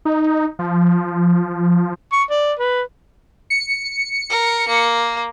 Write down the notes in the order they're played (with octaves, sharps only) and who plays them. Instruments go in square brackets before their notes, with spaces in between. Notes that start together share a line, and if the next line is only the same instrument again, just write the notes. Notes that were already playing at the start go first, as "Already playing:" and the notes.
[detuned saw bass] D#4
F3
[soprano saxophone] C#6
D5
B4
[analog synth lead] C#7
[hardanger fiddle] A#4
A#3